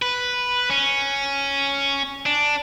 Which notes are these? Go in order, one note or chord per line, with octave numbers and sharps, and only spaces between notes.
B4
C#4
D4